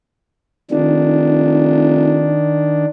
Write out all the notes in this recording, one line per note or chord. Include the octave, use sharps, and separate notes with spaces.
F1 D#3 D4